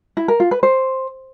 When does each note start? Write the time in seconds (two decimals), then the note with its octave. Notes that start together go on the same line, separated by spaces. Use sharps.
0.17 E4
0.28 A#4
0.40 F4
0.51 B4
0.63 C5